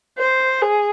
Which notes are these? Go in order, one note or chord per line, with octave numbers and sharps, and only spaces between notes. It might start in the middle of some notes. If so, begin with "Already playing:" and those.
C5
G#4